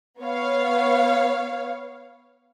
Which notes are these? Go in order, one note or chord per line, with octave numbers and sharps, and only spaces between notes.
B3 C#5 F5